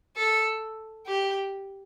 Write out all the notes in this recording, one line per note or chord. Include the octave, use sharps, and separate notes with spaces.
A4
G4